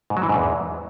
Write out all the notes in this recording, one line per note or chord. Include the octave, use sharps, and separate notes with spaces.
G#2
F#3
E3
G#2
E2